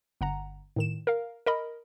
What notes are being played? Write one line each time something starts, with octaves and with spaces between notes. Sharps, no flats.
G1 F#5 A#5
A2 D#3 E7
A#4 F5
A#4 D#5 B5